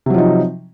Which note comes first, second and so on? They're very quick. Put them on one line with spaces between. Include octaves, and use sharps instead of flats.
C3 F#3 F3 D#4